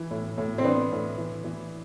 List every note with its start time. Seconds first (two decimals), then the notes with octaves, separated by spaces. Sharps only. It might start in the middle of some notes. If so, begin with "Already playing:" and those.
Already playing: E3
0.11 A2
0.38 A2
0.58 C4
0.64 E3 B3 D4
0.92 A2
1.18 E3
1.44 E3